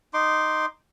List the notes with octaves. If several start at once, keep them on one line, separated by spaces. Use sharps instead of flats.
D#4 C6 D6